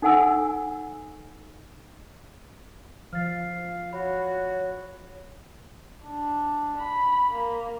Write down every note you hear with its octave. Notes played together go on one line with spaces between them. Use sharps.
D#4 A4 F#5 G#5 E6
F3 F5 F6 A6
F#4 C#5 B5
D4
B5
A#3